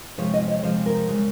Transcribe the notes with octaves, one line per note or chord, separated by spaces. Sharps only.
C3 F3 G#3 C#5
D#5
C#5
C3 F3 G#3 C5
A#4
C#3 G#3